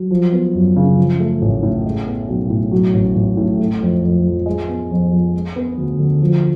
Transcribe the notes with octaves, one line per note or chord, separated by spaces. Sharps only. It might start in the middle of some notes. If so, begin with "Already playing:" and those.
Already playing: F#3
F3
B3
F#2
C#3
F3
A3
A1
A2
G#3
B3
B1
A2
F#3
A1
A1
A2
A3
F2
F2
F3
G#3
B3
F2
F3
G#3
B3
D2
D3
F3